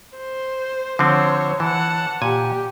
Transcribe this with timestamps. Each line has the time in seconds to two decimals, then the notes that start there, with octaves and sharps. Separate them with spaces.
0.17 C5
0.99 D3 F3 C4 C5 C#5
1.60 E3 F#5 A5
2.22 A#2 G4 G#5